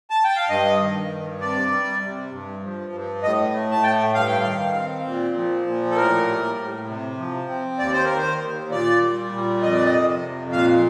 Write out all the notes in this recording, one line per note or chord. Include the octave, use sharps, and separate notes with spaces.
A5
G5
F5
G2 D#5
D#3
G2
C3 D5
G3
C3
G2
F3
G2
A2 D#5
A3
A5
A2 G5
G2 F5
G5
F5
D#3
C4
A#2
F3
A#2
A4
A2 A#4
G3
A2
C3
F3
C4
D#2 D5
C5
A#4
D#3
C5
D#2
A#2 D5
G3
A#2
F2 D#5
D5
D#5
C3
F2
A#2 F5